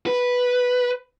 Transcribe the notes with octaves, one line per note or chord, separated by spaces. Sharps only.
B4